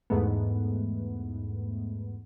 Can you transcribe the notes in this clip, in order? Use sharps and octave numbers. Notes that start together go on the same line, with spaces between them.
E2 G#2 A3 B3